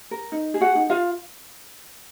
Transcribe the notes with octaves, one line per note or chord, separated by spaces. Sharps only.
A#4
D#4
G#4
F#4 F#5
D#4
F4 F5